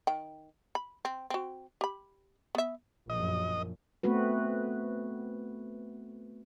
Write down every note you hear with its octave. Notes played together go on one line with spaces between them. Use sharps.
D#3 G5
B5
C4
C4 F#4
G4 B5
B3 E5
A#1 F#2 D#5
A3 B3 C4 F#4 B4